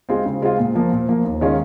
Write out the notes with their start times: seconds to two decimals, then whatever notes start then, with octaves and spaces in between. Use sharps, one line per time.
0.09 G#3 C4 F4
0.26 C#3
0.42 G#3 C4 F4
0.58 A#2
0.75 F3 A#3
0.92 A#2
1.09 F3 A#3
1.25 D#2
1.41 D#3 G#3 C#4 F4